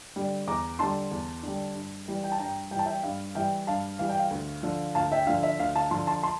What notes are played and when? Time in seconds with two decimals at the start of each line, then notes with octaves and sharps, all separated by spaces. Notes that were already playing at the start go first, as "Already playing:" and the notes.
0.16 D3 G3
0.47 E2 A#5 D6
0.79 D3 G3 A5 C6
1.11 E2
1.43 D3 G3
1.75 G2
2.08 E3 G3
2.24 G5
2.32 A5
2.39 G2 G5 A#5
2.71 G3 G5
2.74 E3 A5
2.85 E5 G5
3.03 G2 F5
3.35 E3 G3 E5 G5
3.67 G2 F5 A5
3.99 E3 G3 F5
4.09 G5
4.19 F5
4.31 D2
4.63 D3 F3
4.95 D2 F5 A5
5.12 E5 G5
5.27 D3 F3 F5
5.43 E5
5.59 D2 F5
5.76 F5 A5
5.91 D3 F3 A5 C6
6.07 A5 C6
6.23 A5 C6